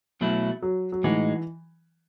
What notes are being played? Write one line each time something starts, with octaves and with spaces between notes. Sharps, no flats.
B1 B2 F#3 A3 E4
F#3
F#3
A2 E3 G#3 D#4 F#4